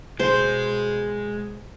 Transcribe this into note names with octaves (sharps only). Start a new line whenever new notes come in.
B2 G#3 G#4 C5